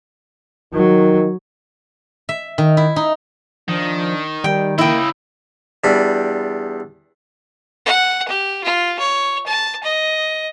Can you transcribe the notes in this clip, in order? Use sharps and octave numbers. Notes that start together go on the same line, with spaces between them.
D#3 F#3
E5
D#3
E4
D#4
D#3 F3 D4
D#3 G3 G5
C#3 A#3 E4 D#5 G5
E2 G3 D4 B5
F#5
G4
F4
C#5
A5
D#5